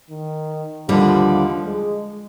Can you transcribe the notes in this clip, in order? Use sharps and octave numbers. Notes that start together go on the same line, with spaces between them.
D#3
D#2 D3 F3 G3
G#3